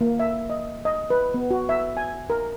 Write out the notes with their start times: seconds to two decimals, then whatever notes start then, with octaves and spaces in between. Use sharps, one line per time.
0.01 A#3
0.19 E5
0.50 D#5
0.85 D#5
1.10 B4
1.34 B3
1.51 F#4
1.69 E5
1.97 G#5
2.30 A#4